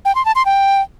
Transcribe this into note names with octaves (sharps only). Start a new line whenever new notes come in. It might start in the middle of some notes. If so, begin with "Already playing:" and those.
G5
C6
A5
C6
G5